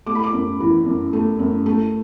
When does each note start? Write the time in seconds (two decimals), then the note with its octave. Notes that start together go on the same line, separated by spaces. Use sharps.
0.06 A3 D6
0.15 B5
0.24 D6
0.33 F#2
0.60 E3
0.86 F#2
1.13 A3
1.39 F#2
1.66 A3